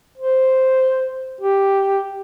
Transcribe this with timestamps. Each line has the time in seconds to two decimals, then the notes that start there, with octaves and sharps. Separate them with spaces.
0.18 C5
1.41 G4